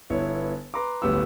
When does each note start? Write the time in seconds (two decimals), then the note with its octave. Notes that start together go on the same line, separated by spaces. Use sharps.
0.10 G1 B3 E4 C#5
0.74 B4 A#5 C6 D6
1.02 D1 G1 A2 B3 G4 E6